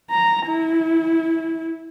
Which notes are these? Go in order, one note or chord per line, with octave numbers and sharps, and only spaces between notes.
A#5
E4